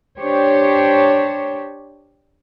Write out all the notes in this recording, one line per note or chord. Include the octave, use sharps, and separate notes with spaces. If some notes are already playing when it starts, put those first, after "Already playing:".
D4 G4 C5 C#5